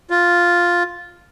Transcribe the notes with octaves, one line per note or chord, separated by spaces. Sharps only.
F4